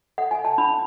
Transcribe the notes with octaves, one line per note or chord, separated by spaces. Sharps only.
A4 F#5
G#5
A5
D4 B5